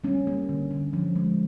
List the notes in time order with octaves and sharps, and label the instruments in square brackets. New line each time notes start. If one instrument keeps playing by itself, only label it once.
[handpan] G3 C#4
A#3
D3
D3
F3
G#3